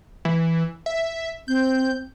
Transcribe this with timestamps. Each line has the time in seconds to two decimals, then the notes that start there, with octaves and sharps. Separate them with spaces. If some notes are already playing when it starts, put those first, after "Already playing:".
0.25 E3
0.86 E5
1.48 C4 G6